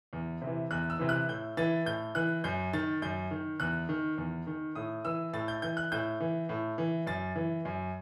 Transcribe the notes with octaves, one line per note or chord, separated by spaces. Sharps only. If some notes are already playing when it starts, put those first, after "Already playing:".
E2
C3
E3
E2 F#6
E6
C3 E3
F#6
A2 G6
E3 A6
A2 G6
E3 F#6
F#2 G6
D#3 A6
F#2 G6
D#3
E2 F#6
D#3
E2
D#3
A2 D#6
E3 E6
A2 A6
G6
E3 G6
F#6
A2 G6
E3
A2
E3
F#2 A6
E3
F#2